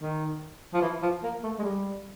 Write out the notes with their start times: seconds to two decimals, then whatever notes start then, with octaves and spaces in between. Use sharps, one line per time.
0.01 D#3
0.73 F3
0.82 E3
1.02 F3
1.23 A#3
1.43 A3
1.59 G#3
1.63 G3